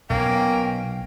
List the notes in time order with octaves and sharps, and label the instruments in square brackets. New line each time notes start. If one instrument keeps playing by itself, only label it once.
[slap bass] B1 [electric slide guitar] B2 C#4 [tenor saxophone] A#3 [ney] G5